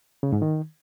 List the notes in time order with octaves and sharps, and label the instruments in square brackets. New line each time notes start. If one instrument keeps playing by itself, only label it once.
[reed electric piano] C#3
G#2
D#3